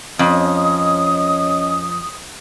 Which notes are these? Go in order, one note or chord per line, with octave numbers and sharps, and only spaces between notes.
F2 C#4 D#5 D#6